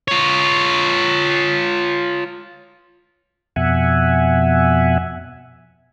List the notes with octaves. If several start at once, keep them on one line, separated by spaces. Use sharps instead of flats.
F4 C#5
F2 B2 E5 F#5 G#5